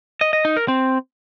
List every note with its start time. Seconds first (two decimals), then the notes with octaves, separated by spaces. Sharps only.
0.21 D#5
0.33 D#5
0.45 D#4
0.57 A#4
0.68 C4